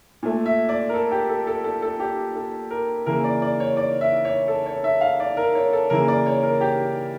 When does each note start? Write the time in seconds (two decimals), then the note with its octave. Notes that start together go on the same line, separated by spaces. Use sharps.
0.23 A#2 A3
0.46 E5
0.69 D5
0.89 A#4
0.94 A4
1.12 G4
1.29 A4
1.47 A4
1.64 A4
1.82 A4
2.00 G4
2.35 A4
2.71 A#4
3.06 C#3 E3 A#3 A#4
3.24 D5
3.42 D5
3.60 C#5
3.77 D5
4.01 E5
4.25 C#5
4.48 A4
4.66 C#5
4.84 E5
5.01 F5
5.20 D5
5.37 A#4
5.55 C#5
5.73 A4
5.90 C#3 E3 A#3 A#4
6.08 D5
6.26 C#5
6.43 A#4
6.61 G4